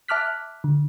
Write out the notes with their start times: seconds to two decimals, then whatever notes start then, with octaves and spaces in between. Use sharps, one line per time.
0.08 E5 A5 D6 F6 F#6 B6
0.64 D3